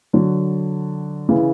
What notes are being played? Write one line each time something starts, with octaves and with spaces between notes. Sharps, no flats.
D3 F#3
C#3 E3